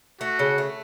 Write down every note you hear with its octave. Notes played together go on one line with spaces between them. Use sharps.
A3 F#4
C#3
A3